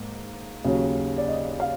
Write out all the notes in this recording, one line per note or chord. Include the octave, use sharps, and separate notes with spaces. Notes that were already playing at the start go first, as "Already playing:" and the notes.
Already playing: G#2 A#3
D#2 C#3 F#3
D5
D#5
F5